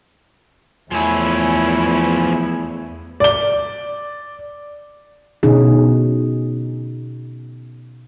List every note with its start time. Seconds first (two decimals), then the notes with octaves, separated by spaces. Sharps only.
0.91 E2 F3 A3 C#4 E4 G#5
3.20 D5 G7
5.43 B2 D3 C#4 D#4 G#4